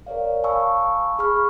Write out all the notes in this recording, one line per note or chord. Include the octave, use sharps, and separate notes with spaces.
A#4 C#5 D5 F5
F5 G#5 A5 B5 C#6 E6
G#4 B5 C#6 F6